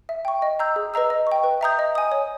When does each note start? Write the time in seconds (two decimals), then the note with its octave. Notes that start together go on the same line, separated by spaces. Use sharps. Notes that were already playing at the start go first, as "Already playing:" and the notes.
0.09 E5
0.25 G5 C#6
0.42 D#5
0.59 A#5 E6 G6
0.76 G#4
0.94 B4 D#5 A#5 E6
1.10 D#5
1.27 G5 C#6
1.44 B4
1.61 E5 A#5 D#6 G6
1.79 D#5
1.95 G#5 D#6
2.12 C#5